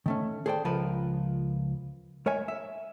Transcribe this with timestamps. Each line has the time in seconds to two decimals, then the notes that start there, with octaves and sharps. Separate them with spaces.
0.06 D#3 A3 C#4
0.46 G#4 A4 C5 D5 G5
0.65 C#2 F3 A#4 B4 A5
2.26 G#3 A#4 C#5 E5 G#5
2.48 E5